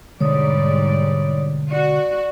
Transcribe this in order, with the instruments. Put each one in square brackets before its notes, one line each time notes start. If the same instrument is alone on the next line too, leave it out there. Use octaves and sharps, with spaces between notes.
[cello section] G#2 G3 D5 [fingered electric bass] B2 D3 G#3 [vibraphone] C#5 D#6
[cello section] F#4 [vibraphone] D5